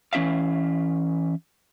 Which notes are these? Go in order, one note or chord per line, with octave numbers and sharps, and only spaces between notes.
E3 C#4 E4 E5 F5